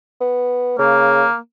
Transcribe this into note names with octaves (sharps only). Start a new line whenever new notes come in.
B3
C#3 A#3